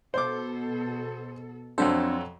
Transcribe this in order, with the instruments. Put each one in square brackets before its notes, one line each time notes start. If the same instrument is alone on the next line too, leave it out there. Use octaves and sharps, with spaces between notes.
[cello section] B2 A4 [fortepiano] C5 D6
[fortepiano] F2 F#3 A4 [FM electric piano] C4 D4 C5